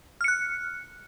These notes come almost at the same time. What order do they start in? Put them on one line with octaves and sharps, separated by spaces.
F6 C#7 F#6